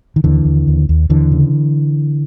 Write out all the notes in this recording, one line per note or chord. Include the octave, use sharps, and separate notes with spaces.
D#3
D#2 D3 E3
D#2
D#2
D#2
D#2 D3 E3
C#3